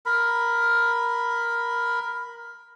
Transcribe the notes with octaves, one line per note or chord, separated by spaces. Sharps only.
A#4 B5